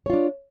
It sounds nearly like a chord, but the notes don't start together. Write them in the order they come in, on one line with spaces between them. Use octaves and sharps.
C#5 F4 D4